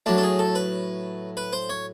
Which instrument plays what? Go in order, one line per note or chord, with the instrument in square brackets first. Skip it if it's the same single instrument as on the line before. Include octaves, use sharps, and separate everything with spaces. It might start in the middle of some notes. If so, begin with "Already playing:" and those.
[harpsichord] A2 F#3 D4
A4
G#4
A4
B4
B4
C5
C#5